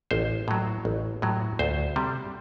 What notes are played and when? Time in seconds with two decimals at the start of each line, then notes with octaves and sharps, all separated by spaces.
0.11 A1 C5
0.48 A2 F#3
0.85 A1
1.22 A2 F#3
1.59 D2 C5
1.96 C3 G3